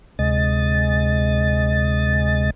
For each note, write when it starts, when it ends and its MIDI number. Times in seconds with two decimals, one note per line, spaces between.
0.19 2.50 38
0.19 2.50 48
0.19 2.50 56
0.19 2.50 75
0.19 2.50 93